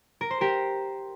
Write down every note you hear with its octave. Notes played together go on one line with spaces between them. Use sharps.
A#4
C5
G4 A#4